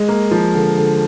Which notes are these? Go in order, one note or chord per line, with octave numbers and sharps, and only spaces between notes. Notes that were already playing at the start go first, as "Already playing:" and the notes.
Already playing: G#3
A#3
F3
D3
D3